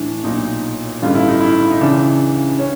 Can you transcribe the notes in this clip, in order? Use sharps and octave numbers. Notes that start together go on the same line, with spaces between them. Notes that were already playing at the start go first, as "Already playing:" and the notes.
Already playing: A2 E3 D4
B1 A#2 D#4
A1 G2 D3 F4
E4
D#4
E4
D#4
C#2 C#3 E3 D4
C#4